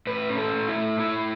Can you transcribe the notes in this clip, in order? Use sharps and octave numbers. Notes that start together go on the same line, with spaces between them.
A2 B4
C#4
A4
A2
E4
A3
A2 E4